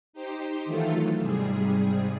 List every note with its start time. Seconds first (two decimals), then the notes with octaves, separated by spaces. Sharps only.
0.13 D#4 G4 C5
0.65 D#3 E3 F#3 A3 F4 A4
1.19 G#2 C3 G3 G#4